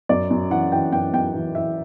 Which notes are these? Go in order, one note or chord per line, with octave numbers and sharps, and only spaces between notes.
F#2 D5
F#2
E3 F#5
E3 G5
F#2 G5
F#2 G5
E3
E3 E5